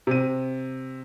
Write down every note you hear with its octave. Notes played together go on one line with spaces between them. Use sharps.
C3 D#7